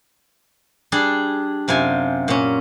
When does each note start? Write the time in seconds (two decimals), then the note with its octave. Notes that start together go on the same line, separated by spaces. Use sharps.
0.92 G3 D4 G#4
1.68 F#2 C3 F4 G#5
2.28 A#2 C#4